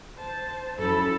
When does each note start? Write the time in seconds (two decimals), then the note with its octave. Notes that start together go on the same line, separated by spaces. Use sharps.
0.17 C5 A5
0.79 F#2 E4 A4 B5